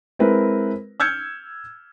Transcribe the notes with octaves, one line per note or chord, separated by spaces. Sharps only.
G#3 C4 E4 A#4 B4
E6 F6 G6 G#6 C#7